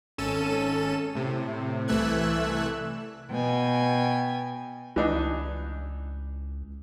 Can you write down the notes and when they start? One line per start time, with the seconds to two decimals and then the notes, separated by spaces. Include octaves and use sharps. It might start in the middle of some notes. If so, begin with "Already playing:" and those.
0.18 G#1 C#4 A4 D#7 E7
1.15 A2 C3
1.88 C2 E3 A3 E6 F#6 G#6
3.28 B2 G5 G#5
4.96 C#2 E3 D4 D#4